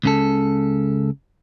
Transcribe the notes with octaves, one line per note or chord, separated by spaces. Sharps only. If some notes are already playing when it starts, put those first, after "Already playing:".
C#2 C#3 A4